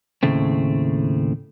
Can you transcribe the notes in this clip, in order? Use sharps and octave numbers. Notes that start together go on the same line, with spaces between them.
D#2 A2 C#3 A3 C4